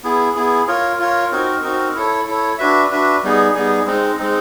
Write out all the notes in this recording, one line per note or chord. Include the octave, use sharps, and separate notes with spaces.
B3 E4 G#4
B3 E4 G#4
F4 A#4 C#5
F4 A#4 C#5
C4 D#4 F#4 A#4
C4 D#4 F#4 A#4
E4 A4 C#5
E4 A4 C#5
D4 F#4 B4 E5
D4 F#4 B4 E5
G3 B3 D#4 G#4
G3 B3 D#4 G#4
G#3 C4 D#4
G#3 C4 D#4